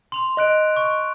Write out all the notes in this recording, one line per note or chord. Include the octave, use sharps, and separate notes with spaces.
C6 F7
D#5 C6 F#6 D7
C#6